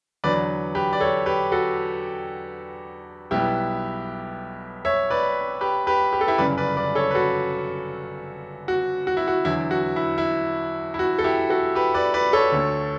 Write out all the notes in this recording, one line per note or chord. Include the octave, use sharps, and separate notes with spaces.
E2 D3 F#3 B4 D5
G4 B4
D5
A4 C#5
G4 B4
F#4 A4
B1 B2 G3 B3 E4 G4
C#5 E5
B4 D5
G4 B4
G4 B4
G4
A4
E4 G4
G1 F#2 C#3 B4 D5
B4 D5
B4 D5
A4 C#5
B4
F#4 A4
F#4
F#4
E4
F#4
E2 D3 F#3 E4
F#4
E4
E4
E4
F#4
A4
E4 G4
F#4 A4
G4 B4
B4 D5
B4 D5
A4 C#5
D2 D3 A3